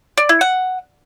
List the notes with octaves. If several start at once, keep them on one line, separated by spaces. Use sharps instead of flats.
D5
E4
F#5